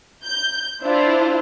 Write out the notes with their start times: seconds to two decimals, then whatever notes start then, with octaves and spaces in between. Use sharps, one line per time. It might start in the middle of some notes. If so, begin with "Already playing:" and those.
0.24 G6
0.84 D4 E4 F4 C5